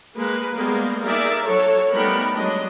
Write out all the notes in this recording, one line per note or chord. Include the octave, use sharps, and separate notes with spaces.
G#3 A#3 B4
G3 G#3 A#3 B3
A#3 D#4 G#4 A#4 D5 E5
F#3 A4 C#5
G3 A3 B3 D#4 A#4 B5
F#3 G#3 D4 D#5